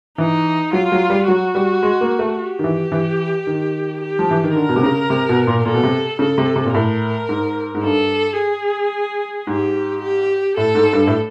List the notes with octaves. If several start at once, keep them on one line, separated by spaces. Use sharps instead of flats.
E3 D#4
F#3 F4
F#3
G3
F#3 F#4
G3
G#3
A#3
A3
G4
D#3
E3
E3
D#3
G4
F3
E3
D#3
D3 A#4
B2
C3
C#3
C3
B2
A#2
A#2 A4
B2
C3
C#3 A4
C3
C3
A#2
A2 A#4
G#2
G#2
G2 A4
G#4
G#2 G4
G4
A2 A4
G#2
G2
A2